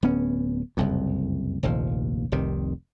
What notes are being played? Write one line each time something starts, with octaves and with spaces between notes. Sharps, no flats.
D1 B3 C#4
F#1 C2 F2
F1 A#1 D#2 F3
F1 C2 C3 D#3